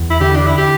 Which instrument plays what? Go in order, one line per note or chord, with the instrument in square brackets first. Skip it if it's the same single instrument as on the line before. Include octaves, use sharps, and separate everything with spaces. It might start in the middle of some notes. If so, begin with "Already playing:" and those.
Already playing: [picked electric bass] E2
[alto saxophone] E4
[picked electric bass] D3 [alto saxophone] G4
[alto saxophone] D4
E4
G4